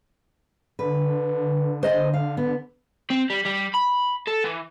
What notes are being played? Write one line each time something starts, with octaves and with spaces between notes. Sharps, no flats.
D3 B4
C5 D#5 G#5
F5
B3
C4
G3
G3
B5
A4
E3